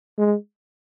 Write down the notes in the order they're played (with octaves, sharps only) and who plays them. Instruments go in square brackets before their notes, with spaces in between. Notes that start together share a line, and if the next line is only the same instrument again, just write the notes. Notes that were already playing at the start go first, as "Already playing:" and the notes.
[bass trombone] G#3